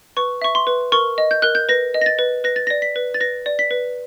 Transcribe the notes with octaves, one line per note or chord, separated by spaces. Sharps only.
B4 C#6
E5 C#6
C6
B4
A#4 C#6
D#5
G6
A#4 F#6
G6
B4 A#6
D#5
A#6
A6
B4
B4 A#6
A6
A#6
D5
B6
B4
A6
B4 A#6
D5
B6
B4